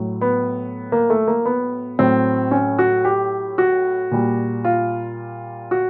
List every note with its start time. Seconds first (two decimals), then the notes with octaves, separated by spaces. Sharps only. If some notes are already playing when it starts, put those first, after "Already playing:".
Already playing: A2 F#3
0.21 B3
0.92 A#3
1.10 A3
1.27 A#3
1.45 B3
1.99 A2 F#3 C4
2.51 C#4
2.79 F#4
3.05 G4
3.58 F#4
4.11 A#2 G3
4.65 F4
5.71 F#4